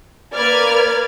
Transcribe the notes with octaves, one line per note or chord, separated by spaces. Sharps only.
A#3 B4 D5 F6 G#6